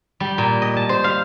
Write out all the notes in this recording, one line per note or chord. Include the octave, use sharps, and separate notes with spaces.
G3
A#2
D#5
A5
C5
F5